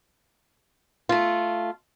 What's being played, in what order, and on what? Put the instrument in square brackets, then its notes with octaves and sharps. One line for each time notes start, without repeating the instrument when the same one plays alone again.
[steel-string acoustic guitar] A3 F4